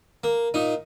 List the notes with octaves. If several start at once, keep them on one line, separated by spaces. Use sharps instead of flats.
A#3
A#2 D#4